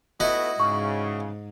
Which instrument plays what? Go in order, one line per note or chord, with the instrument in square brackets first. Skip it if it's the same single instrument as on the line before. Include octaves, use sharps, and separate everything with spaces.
[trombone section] C#2 A3 B3 [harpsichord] E4 F#4 D#5
[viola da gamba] G#2 [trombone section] C#3 [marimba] C#6